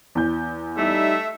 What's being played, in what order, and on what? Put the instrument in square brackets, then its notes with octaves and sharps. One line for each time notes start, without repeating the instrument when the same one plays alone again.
[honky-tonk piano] E2 G6
[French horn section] G3 D#4 [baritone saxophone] A3 [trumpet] E5